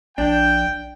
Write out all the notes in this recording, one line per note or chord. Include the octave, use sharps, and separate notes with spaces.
A#1 D4 G5